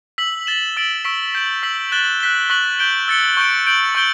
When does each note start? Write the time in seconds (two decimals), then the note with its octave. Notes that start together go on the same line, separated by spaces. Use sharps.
0.18 E6 B6 F#7
0.47 A6 E7 G7
0.77 E6 A6 D7 F#7
1.04 C#6 E6 B6 D7
1.35 G6 B6 D7 F#7
1.63 E6 B6 F#7
1.92 F#6 A6 E7 G7
2.20 F#6 B6 E7 G7
2.50 C#6 F#6 B6 F#7
2.79 G6 D7 G7
3.08 E6 A6 C#7 G7
3.37 C#6 G6 D7 G7
3.67 G6 D7 F#7
3.95 C#6 E6 G6 D7 G7